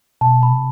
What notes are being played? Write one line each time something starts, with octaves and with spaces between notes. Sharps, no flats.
B2 A5
B5
C3